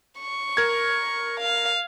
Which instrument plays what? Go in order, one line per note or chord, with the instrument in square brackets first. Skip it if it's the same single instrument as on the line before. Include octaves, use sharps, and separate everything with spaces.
[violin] C#6
[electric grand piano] A#4 G#6
[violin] F5